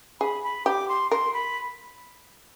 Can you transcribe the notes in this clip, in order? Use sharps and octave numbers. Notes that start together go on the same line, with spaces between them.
G#4 B5
B5
G4 D6
C6
A#4 C6
B5